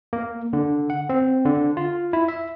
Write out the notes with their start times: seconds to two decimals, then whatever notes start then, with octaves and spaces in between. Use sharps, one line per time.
0.13 A#3
0.53 D3
0.90 F#5
1.09 C4
1.45 D3
1.77 F4
2.13 E4
2.28 E5